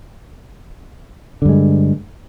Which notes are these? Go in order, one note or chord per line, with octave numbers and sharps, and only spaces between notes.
G2 D3 G#3